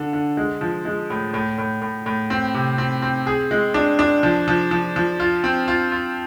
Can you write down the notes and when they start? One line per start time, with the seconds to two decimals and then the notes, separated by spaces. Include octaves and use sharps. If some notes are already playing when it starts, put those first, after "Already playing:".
Already playing: D3 A4
0.13 D3
0.37 G#3
0.61 F3
0.85 G#3
1.10 A2
1.34 A2
1.58 A2
1.82 A2
2.06 A2
2.30 C4
2.54 C3
2.78 C4
3.02 C4
3.27 G#4
3.51 G#3
3.74 D4
3.99 D4
4.23 F3
4.48 F3
4.71 F3
4.96 F3
5.20 F4
5.44 C4
5.68 F4
5.92 F4